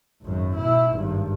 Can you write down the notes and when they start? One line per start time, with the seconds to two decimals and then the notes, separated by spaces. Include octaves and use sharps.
0.22 G#1 F#2
0.55 B2 E4
0.92 G#1 G2